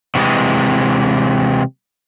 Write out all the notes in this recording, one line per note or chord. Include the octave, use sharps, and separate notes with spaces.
C3 E3 F#3 G#3